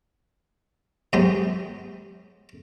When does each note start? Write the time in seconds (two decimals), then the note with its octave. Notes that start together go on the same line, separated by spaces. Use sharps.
1.13 G#2 F#3 G#3 B3 G4